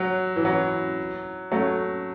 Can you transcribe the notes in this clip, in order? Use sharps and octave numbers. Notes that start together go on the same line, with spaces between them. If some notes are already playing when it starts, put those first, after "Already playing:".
Already playing: F#3
E3
F#3
F#3 A3